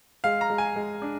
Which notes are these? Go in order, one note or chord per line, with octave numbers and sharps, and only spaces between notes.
G#3 F5
A#5
G#3
G#5
G#3
D4